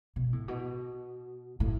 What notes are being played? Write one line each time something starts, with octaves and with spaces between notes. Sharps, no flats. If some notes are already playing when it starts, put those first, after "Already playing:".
B2
A2
B2
A2